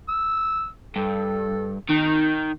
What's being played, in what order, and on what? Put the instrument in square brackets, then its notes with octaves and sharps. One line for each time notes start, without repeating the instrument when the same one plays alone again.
[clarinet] E6
[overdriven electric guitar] G2 [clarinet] A4
[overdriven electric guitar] D#3 [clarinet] D#4